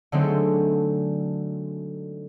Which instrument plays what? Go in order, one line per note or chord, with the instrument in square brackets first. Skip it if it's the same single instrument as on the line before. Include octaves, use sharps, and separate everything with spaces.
[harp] D3 F#3 G#3 A3 C4 D#4